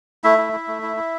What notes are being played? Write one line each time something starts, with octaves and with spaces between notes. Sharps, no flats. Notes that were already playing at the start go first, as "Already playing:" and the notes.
A3 E4 E5
E4
E4
A3
E4
E4